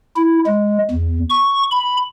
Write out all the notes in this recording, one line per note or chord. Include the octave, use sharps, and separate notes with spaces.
E4
G#3
E2
C#6
B5